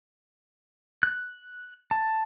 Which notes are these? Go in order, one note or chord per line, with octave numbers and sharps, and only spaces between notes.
F#6
A5